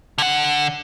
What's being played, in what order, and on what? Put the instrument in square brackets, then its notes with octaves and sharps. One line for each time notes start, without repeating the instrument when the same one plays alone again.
[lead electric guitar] D3 F#5